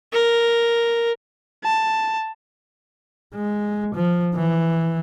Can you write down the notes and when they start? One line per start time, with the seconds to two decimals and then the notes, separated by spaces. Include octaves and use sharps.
0.13 A#4
1.64 A5
3.35 G#3
3.95 F3
4.35 E3